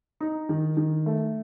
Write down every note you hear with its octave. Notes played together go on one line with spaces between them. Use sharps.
D#4
D#3
D#3
A3